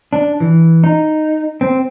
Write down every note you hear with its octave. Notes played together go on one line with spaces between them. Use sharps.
D4
E3
D#4
C4